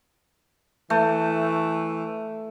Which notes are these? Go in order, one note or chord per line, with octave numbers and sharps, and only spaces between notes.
E3 A3